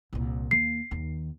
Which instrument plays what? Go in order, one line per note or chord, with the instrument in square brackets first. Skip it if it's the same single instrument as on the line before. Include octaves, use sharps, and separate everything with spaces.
[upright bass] C2 A#2
[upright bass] D#2 A#3 [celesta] C7
[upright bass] D#2 D#3